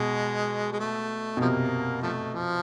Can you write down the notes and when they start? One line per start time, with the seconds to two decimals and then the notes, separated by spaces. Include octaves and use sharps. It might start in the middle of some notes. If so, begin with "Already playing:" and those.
Already playing: B2 G#3
0.73 G#3
0.80 A3
1.37 B2
1.41 C3 F3 A#3
2.02 F3 A3
2.33 F3